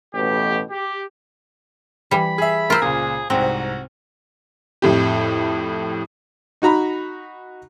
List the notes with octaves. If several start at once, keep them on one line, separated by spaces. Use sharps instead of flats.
A1 B2 G4
G4
E3 G3 B5
G#4 E5
F4 A#4 C5 E6
C#2 A#2 G#4
C2 G#2 C4 F#4
F2 A2 G4
D#4 F#4 A#5 B5